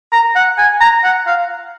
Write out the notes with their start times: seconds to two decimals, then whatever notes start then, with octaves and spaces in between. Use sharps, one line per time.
0.13 A#5
0.36 F#5
0.58 G#5
0.81 A#5
1.04 F#5
1.27 F5